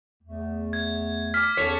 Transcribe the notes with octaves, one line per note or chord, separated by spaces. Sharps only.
E2 A3
G#6
D6 F6 B6
E2 C#4 A4 C#5